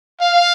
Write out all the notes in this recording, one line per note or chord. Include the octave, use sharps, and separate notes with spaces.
F5